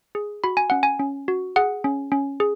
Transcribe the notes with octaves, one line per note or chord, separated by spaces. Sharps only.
G#4
F#4 B5
G#5
C#4 F#5
G#5
C#4
F#4
G#4 F#5
C#4
C#4
G#4